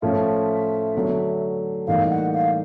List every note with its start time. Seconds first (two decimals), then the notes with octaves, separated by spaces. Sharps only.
0.02 A2 F3 A3 C#4 F4 E5
0.95 D3 F#3 A3
1.87 A2 E3 G3 A#3 D#4 F5
2.10 F#5
2.34 F5